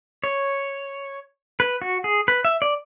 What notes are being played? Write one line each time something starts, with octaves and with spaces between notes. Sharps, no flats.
C#5
B4
F#4
G#4
B4
E5
D5